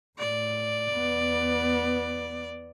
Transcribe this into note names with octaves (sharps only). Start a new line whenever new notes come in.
A2 D5
E2 B3